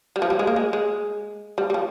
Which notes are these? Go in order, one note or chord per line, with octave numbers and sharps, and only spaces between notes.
G3
F3
G3
G#3
A#3
G#3
G#3
G3
G3
F3